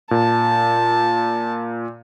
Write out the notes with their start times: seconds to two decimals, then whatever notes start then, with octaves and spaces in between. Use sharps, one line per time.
0.11 A#2 A5